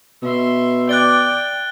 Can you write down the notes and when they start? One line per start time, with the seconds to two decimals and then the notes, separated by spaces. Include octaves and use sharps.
0.22 B2 E5 C6
0.89 D5 G5 F#6 A6 G7